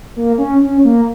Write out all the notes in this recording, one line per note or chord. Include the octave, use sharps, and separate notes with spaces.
A#3
C#4
C#4
A#3